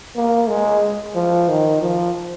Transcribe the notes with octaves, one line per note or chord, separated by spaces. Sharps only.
A#3
G#3
F3
D#3
F3